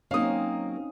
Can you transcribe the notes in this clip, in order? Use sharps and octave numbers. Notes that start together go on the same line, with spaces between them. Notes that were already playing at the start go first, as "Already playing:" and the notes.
F#3 A#3 C4 C#4 D#4 F5 D#6